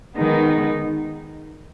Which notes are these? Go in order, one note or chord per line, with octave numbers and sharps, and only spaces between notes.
D#3 G#3 B3 D#4